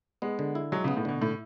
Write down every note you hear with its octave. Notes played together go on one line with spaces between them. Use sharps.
G#3 B3
D3
E4
F#3 G#3
C#3 B3
A2
B2 D3
A2 E4